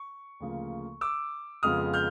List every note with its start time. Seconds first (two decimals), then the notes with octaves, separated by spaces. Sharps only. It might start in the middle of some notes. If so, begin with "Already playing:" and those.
Already playing: C#6
0.40 D2 C#3 F3 A#3
1.01 D6 E6
1.63 F2 C#3 F3 G#3 B3 D#6 F6
1.93 F6 G6